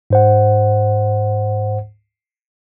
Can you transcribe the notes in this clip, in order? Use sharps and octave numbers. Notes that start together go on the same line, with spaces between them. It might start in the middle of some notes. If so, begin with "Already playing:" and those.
G#2 C5 F#5